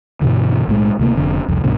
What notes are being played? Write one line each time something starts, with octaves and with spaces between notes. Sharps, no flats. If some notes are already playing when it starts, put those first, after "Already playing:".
G2 B2 D3 E3
B1 A2 G#3
D2 C3 G3 A#3
F1 F2 D3
C2 F2
C2 G2 B2 D3